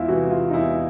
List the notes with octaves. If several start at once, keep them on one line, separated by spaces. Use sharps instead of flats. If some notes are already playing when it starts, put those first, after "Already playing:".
Already playing: E2 E4 F4
C3 E3 F#4
F4
D#4
E2 E4